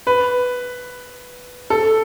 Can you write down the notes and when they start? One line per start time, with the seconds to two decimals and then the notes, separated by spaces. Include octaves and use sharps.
0.07 B4
1.70 A4